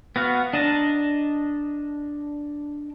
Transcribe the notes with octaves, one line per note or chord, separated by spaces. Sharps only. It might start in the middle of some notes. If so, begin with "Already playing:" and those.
B3 F#4 F5
D4 D#5 A5 A#5